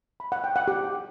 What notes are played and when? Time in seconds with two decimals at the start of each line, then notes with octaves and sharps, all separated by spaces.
0.20 B5
0.32 F#5
0.44 G5
0.56 F#5
0.68 G4